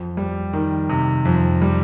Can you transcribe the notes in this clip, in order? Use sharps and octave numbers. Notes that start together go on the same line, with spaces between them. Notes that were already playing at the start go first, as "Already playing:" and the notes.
Already playing: F2
G3
D#3
C3
F2
G3